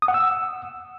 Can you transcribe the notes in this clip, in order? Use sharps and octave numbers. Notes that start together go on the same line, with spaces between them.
D#6
F#5
E6